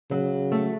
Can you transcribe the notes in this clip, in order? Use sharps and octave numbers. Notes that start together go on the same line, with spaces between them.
C#3 F#3
A3